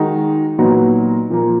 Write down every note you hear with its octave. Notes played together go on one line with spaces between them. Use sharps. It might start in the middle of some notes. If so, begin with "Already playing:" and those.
Already playing: D#3 G#3 D#4 F#4
A#2 F#3 B3 D#4 F#4
A#2 F3 A#3